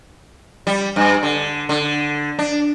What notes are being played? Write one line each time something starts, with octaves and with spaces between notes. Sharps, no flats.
G3
G2
D3
D3
D4